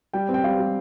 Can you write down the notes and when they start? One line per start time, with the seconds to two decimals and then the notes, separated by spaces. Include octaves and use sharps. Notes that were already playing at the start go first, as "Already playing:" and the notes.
0.13 G3 G5
0.29 C4
0.34 G5
0.44 G3 F5
0.59 G3